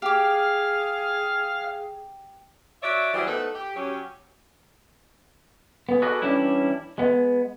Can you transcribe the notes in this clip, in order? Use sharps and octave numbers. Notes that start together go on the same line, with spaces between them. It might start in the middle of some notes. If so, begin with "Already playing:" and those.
G4 G#4 F5 D6
F#4 C#5 D5 E5
E3 F#3 G3 G#4 C5 D5
A3 B3 D#4 A4 B4
G4
F#3 C#4 G4
B3 G#4
F#4 G#4 A4 B4 D5 D#5
E3 G3 C#4 D4 E4
G#3 B3